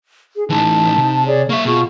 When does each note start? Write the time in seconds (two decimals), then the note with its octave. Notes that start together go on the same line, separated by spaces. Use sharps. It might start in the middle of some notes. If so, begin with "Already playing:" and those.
0.36 G#4
0.50 A2 E3 D#4 A5
0.98 C3
1.26 G#4 C#5 D5
1.49 A#3 E5 C#6
1.65 B2 F4 G#4 C#6